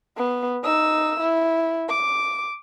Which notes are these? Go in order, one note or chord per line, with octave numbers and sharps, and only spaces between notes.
B3
D#4 E6
E4
D6